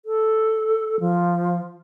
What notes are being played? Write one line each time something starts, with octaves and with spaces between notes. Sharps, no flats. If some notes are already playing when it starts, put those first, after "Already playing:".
A4
F3